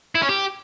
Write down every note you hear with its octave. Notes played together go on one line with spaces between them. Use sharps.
E4
C#4
G4